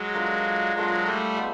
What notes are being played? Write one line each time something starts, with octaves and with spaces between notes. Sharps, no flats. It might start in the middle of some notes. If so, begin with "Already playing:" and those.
Already playing: F#3 G#3
A#3 D4 F4 A4
F#3 G#3 A#3 D4 F4 A4
G3 A3
G#3 B3